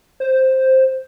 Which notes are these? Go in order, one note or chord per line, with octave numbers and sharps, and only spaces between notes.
C5